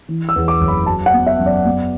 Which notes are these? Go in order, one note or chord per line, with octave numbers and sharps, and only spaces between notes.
E3
E6
E2
D6
F#1
B5
F#3 A5
F#5
B3
E5
F#2
D5
B3